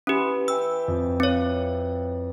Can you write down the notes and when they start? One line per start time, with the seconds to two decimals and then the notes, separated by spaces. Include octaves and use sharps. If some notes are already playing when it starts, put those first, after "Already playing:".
0.07 E3 C#4 G4
0.48 E5 G5 G#5 E6
0.88 F2
1.20 C4 C#5 G5